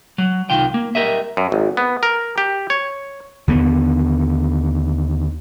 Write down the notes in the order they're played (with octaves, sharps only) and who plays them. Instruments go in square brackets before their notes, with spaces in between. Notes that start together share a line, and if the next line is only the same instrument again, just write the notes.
[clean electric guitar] F#3
C2 D#3 F4 G5
A#3
G4 A#4 D#5 E5
[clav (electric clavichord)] F#2
G#1
B3
A#4
G4
C#5
[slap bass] D#2 D3 F3 B3